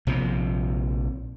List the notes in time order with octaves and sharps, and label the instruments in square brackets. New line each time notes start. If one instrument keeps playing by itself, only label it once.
[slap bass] A#1 C3 F3